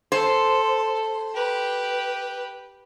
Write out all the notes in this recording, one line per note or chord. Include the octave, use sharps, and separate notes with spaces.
A4 C5
G4 B4